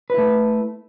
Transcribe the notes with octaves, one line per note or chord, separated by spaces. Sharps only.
A3 E4 B4